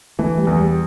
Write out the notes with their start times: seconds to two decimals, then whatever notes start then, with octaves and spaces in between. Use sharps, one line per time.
0.19 E3 A3
0.38 G3
0.47 E2 A3
0.57 G3